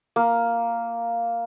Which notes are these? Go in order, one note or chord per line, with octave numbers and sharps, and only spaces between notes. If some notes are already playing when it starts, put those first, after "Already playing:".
A#3